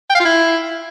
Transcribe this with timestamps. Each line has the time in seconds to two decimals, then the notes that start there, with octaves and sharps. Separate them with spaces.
0.10 G5
0.15 F5
0.20 F4
0.25 E4